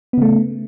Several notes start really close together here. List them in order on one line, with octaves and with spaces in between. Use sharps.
B3 C#3 A3